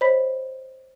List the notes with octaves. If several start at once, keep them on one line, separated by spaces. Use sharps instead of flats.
C5 C#5 D#5 B5 B6